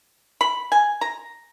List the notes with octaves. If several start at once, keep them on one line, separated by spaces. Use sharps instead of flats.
B5
G#5
A#5